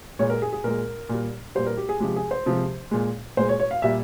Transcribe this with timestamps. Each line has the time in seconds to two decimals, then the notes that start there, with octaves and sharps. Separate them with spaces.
0.19 A#2 G#3 C#5
0.30 A#4
0.42 G#4
0.53 G#4
0.64 A#2 G#3 A#4
1.09 A#2 G3
1.55 A#2 G3 C5
1.66 A#4
1.77 G4
1.89 G#4
2.00 C3 F3 G#3 G4
2.16 G#4
2.31 C5
2.46 C3 F3 G#3
2.91 A#2 G#3
3.37 A#2 G#3 C5
3.49 C#5
3.59 C#5
3.71 F5
3.82 A#2 G3 E5